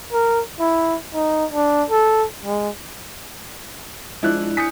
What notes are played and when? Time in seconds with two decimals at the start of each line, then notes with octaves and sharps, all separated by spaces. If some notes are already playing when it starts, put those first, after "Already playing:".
0.13 A#4
0.60 E4
1.14 D#4
1.53 D4
1.90 A4
2.45 G#3
4.23 F3 G#3 D4 E4 F#6
4.57 G#5 D#6 G6 B6 C#7